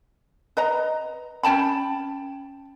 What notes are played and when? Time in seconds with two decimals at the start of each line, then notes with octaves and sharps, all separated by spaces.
0.57 B4 D#5 A#5
1.43 C#4 G5 A5 B5